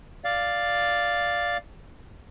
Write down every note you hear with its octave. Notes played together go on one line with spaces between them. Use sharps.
D5 F5